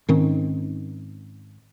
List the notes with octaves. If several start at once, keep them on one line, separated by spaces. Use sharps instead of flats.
G#2 D#3 C4 C#4